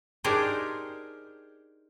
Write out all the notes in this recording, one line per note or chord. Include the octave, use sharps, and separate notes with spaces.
D4 D#4 G4 G#4 A#4 C5